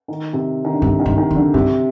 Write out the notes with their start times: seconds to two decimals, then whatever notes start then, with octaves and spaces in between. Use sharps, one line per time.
0.08 D#3
0.33 C3
0.65 D#3
0.73 D3
0.82 G2 C3
0.99 D#3
1.06 G2
1.18 D#3
1.31 F2
1.36 D3
1.54 G2 C3